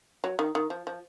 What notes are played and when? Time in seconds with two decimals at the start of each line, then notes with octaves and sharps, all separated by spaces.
0.24 F#3
0.39 D#3
0.55 D#3
0.70 F3
0.87 F3